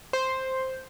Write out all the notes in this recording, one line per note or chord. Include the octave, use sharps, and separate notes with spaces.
C5